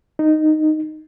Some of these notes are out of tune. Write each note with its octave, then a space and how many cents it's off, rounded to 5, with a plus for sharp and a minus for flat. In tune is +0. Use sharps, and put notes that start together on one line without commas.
D#4 -10